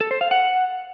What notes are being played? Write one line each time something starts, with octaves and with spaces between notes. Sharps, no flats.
A4
C5
F5
F#5